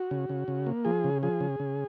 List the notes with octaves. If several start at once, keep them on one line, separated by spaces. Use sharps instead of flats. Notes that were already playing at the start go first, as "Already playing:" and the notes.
Already playing: F#4
C#3
C#3
C#3
A#3
F3 G#4
C#3
F3 G#4
C#3
C#3